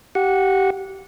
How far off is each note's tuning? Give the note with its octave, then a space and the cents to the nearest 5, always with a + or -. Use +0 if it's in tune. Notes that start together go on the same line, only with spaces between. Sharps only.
G4 -20 F#5 -15